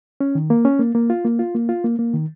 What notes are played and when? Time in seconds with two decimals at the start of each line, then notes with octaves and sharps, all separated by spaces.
0.21 C#4
0.35 D#3
0.50 A#3
0.65 C#4
0.80 A#3
0.95 A#3
1.10 F4
1.25 A#3
1.39 F4
1.55 A#3
1.69 F4
1.84 A#3
1.99 A#3
2.14 D#3